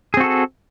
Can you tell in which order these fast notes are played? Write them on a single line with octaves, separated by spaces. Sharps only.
G#4 C4 F#4 A4